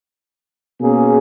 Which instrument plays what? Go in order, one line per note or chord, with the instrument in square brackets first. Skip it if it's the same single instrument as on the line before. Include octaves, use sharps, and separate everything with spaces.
[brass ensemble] B2 A#3 C#4 G#4